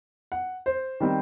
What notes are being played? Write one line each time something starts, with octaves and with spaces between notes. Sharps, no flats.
F#5
C5
D#3 G3 C4